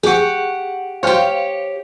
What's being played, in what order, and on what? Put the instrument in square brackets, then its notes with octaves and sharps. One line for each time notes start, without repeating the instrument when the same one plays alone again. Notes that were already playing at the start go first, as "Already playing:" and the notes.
[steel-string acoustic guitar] G4 F#5 [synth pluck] G#4 C#6
[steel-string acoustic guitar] G4 C#5 [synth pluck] C5 F5 G5